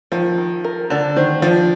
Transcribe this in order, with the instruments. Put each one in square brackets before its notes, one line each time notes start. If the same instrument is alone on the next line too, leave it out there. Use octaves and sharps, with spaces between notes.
[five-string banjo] D#3 [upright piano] F3
[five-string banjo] D#3
A#4
[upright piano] D3 [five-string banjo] D4
[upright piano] D#3 [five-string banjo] C5
[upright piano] F3 [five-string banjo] D4